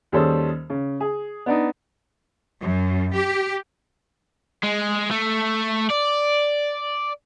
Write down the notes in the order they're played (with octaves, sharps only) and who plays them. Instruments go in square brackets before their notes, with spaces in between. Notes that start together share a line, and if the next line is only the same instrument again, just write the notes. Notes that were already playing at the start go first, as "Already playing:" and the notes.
[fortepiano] D#2 G3 C#4 G#4 A4 C5
C#3
G#4
B3 D4 D#4
[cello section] F#2
G4
[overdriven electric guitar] G#3
A3
D5